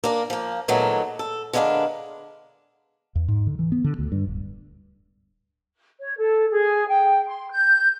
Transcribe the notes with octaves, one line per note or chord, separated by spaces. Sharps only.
A#3 D4 A#4
F3 A#3
A#2 D#3 F#3 G#3 A3 B3
A4
D3 G#3 A#3 D4 B4 F5
E2
G#2
D3
E3
B3
D3
D2
G2
D1
C#5
A4
G#4
G5
C6
G6